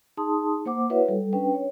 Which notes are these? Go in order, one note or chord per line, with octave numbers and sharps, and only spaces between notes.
D#4 G#4 A5 C6 D#6
A#3 C5 F#5 D6
E4 F#4 B4 C#5 E5 F#5
G3 A4
C#4 D4 B4 G5
C#5